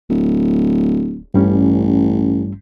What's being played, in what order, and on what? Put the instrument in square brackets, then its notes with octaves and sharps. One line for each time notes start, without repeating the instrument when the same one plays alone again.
[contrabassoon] D1
[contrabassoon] A1 [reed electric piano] G2 G3 C#4